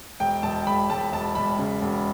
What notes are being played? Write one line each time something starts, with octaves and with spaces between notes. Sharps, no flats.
E1 G5
E1 A5
E1 B5
E1 A5
E1 A5
E1 B5
C#3
E1